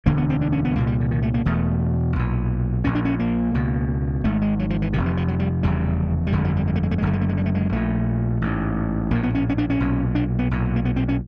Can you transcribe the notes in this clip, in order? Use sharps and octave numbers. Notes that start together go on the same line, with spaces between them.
E1 D2 D3 A#3
B3
C4
D4
C#4
B3
C2 A#2 A#3
G3
D3
D#3
A3
A#3
E1 E2 B2 A3
B1 A#2
A#1 A#2 C#4
D4
C#4
A#3
C#2 B2
G#1 G#2 A3
G#3
F#3
F3
E3
F1 F2 C3 D#3
E3
F3
F#3
G3
F1 E2 C#3 G3
G3
G1 F2 D3 G#3
F#3
G3
G#3
A3
G#3
A3
G#3
F#1 F#2 D3 A3
G#3
A3
G#3
G3
A3
G#3
A#1 A#2 A3
A1 G#2
A#1 A2 A#3
B3
C#4
C#4
D4
C#4
B1 A#2
D4
B3
B1 A#2
A#3
B3
C4
C#4